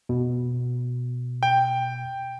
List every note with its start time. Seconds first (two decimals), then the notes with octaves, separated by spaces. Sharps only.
0.09 B2
1.43 G5